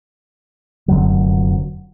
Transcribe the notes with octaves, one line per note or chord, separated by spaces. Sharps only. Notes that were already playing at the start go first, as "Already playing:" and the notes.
F1 F#2 D3 F#3